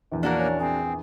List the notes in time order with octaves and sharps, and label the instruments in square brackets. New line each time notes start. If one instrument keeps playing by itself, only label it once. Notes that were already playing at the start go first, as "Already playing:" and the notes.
[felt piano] A#1 E2
[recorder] A#3 [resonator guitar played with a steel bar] D4 F#4 A#4
[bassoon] C#4
[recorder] C4 [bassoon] G#4